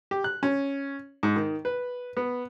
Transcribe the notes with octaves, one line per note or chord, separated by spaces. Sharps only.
G4
F#6
C#4
G#2
D#3
B4
B3